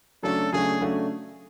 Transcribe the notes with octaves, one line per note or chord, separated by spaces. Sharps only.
C#3 F#3 A3 D4 F#4 A4
C#3 F#3 A3 D4 F#4 G#4
C#3 F#3 A3 D4 F#4